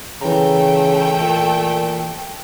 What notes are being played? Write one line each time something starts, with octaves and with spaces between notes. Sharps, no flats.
C#3 E3 A3 G5 A#5
A#2